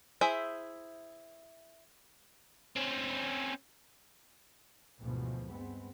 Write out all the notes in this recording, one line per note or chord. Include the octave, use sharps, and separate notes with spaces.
E4 G#4 C5 E5
C4 C#4
D2 G#2 B2 E3 F3
G2 G#3 B3 C4